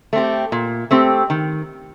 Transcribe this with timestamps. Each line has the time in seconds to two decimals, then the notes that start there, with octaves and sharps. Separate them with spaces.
0.13 A3 C4 G4
0.52 A#2
0.91 A3 C4 G4
1.30 D#3